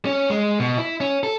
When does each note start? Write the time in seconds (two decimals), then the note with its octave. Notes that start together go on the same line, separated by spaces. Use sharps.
0.05 C#4
0.30 G#3
0.60 B2
0.78 E4
1.00 C#4
1.23 A4